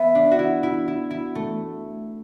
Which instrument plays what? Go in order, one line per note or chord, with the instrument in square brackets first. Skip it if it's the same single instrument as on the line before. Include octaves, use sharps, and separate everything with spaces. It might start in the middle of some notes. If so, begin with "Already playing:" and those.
Already playing: [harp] B3 [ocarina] E5
[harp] D4
F#4
E4
E4
E4
E4
A3